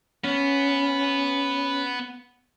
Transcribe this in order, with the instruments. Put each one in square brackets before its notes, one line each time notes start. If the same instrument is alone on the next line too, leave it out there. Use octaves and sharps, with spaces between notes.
[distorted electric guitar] B3 [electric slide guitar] C#4